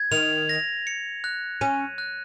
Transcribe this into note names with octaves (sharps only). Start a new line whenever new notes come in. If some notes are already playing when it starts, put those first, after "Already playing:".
Already playing: G#6
D#3 F7
A#6
C#7
F#6
C#4 D#7
F#6